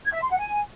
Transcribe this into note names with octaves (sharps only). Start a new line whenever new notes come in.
G#6
E5
C6
F#5
G#5